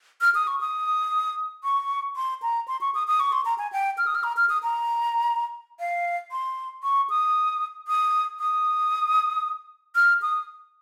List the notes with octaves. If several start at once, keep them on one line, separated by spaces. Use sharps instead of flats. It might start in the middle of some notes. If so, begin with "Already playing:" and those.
F6
D#6
C#6
D#6
C#6
C6
A#5
C6
C#6
D#6
D#6
C#6
C6
A#5
G#5
G5
F6
D#6
F6
A#5
F6
D#6
A#5
F5
C6
C#6
D#6
D#6
D#6
F6
D#6